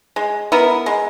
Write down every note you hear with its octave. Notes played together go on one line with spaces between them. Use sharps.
G#3
B3 E4 A#4
G#3